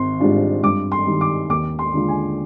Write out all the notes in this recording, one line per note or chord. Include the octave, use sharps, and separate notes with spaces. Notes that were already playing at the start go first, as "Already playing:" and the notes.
Already playing: G#1 C6
G#2 G3 D4 F4
G2 D6
C6
D#3 G3
D6
D#2 D6
C6
D3 G#3 D4 F4
G#5